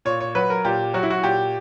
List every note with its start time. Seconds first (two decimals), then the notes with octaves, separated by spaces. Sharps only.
0.05 A#2 C#5
0.20 C#5
0.35 F#3 B4
0.50 A#4
0.65 A#2 G4
0.94 F#3 F#4
1.03 E4
1.10 F#4
1.23 A#2 G4